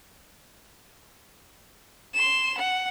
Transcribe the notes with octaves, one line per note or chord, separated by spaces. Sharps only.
C6 E7
F#5